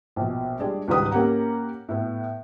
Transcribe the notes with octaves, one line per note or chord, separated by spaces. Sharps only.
A#1 B2
G3 G#3 D4 G#4 D5
C#2 G#2 D#3 G3 B4 D#6
A#3 C#4 G4 F#5 A#5
A2 B3